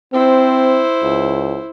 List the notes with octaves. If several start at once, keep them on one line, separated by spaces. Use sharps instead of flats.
C4 E4 C5
C#2